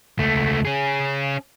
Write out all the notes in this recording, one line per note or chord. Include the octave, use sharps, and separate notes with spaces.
C#2 A3
C#4 G#4